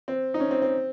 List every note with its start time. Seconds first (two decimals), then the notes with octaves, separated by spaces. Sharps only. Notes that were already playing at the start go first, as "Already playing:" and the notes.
0.08 C4
0.34 D#4
0.40 C#4
0.51 C4
0.62 C4